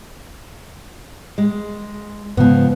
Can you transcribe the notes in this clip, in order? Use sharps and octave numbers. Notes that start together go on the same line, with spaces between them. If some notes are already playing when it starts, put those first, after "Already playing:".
G#3
G#2 C#3 F3 G#3 B3